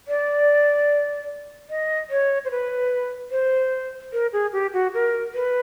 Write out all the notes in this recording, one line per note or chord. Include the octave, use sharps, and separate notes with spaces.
D5
D#5
C#5
C5
B4
C5
A#4
G#4
G4
F#4
A#4
B4